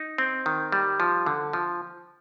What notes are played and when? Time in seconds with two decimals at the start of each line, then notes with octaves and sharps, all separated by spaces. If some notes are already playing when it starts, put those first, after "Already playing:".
Already playing: D#4
0.18 C4
0.46 D#3
0.72 G3
1.00 F3
1.26 D3
1.53 F3